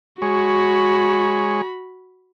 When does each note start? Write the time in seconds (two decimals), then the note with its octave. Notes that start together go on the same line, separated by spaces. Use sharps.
0.22 G#3 F#4 C#5 B5